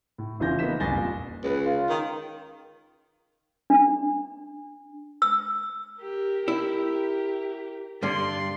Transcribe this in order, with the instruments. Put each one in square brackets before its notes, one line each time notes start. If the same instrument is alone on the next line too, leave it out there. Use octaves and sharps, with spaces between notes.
[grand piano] A2
F1 C#3 E3 F4 G6 A#6
A#3 B3 D#4 B6 E7
F#1 C2 G#5 A6 A#6 G7
A#2
[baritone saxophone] C#2 [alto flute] B4
[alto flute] F4
[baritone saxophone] D#3
[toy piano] D4
E6
[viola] G4 [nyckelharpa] A#4
[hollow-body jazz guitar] E4 [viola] G4
[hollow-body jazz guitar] G2 D3 [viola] D5 [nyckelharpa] C6